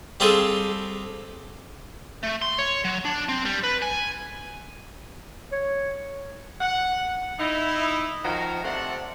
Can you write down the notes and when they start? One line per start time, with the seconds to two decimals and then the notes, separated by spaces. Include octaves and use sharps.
0.20 G3 C4 D4 F4 G#4 A4
2.23 A3
2.42 C6
2.58 C#5
2.85 F#3
3.05 D4
3.29 C4
3.45 G3
3.64 B4
3.82 G#5
5.52 C#5
6.61 F#5
7.38 D#4 E4
8.24 D#3 F3 F#4 A#4 A#5
8.64 C3 A3 C4 D4 F#5